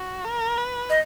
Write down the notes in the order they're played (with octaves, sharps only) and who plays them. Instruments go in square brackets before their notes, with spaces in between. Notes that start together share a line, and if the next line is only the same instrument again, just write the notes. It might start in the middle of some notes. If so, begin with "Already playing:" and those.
Already playing: [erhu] F#4
A#4
B4
[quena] D#5